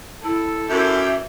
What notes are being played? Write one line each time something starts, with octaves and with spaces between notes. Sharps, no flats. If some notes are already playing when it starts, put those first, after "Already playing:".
E4 A4
F#2 E3 G4 E5